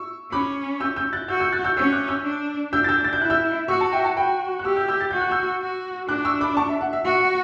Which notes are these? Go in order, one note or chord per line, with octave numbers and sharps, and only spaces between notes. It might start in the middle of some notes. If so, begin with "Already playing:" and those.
Already playing: C#6 E6
C#4 B5 D6
E6 G6
E6 G6
F#6 A6
F#4 E6 G6
E6 G6
F#6 A6
E6 G6
C#4 E6 G6
D6 F#6
E6 G6
D4
D4 E6 G6
A6
E6 G6
A6
G6
E4 F#6
E6 G6
F#4 C#6 E6
A5 C#6
E5 G5
F#5 A5
F#4 G5 B5
F#6
G4 C#6 E6
E6 G6
E6 G6
A6
F#4 G6
F#6
E6 G6
F#4
D4 D6 F#6
C#6 E6
B5 D6
A5 C#6
E5
F#5
E5
F#4 F#5
F#5